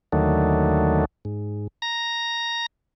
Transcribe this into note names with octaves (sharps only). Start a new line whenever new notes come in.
D#2 D3 D#3 F#3 A3
G#2
A#5 A#6